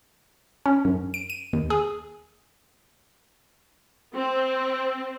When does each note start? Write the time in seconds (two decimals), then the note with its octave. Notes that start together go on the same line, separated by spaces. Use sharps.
0.66 C#4
0.85 F#2
1.14 D7
1.30 D#7
1.53 D#2
1.70 G#4
4.15 C4